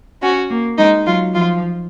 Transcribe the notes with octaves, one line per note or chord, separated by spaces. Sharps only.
C#4 F#4
A#3
G#3 D#4
F#3 F4
F3 F4